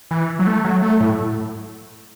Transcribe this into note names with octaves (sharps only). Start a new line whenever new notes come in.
E3
F#3
A3
F#3
A3
A2